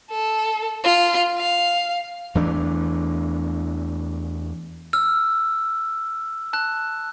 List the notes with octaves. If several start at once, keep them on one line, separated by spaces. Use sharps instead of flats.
A4
F4
F5
E2 E3 A3 D4
E6 F6
A5 F#6